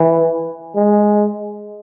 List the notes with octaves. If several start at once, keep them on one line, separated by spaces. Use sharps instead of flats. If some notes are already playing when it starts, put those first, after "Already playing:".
Already playing: E3
G#3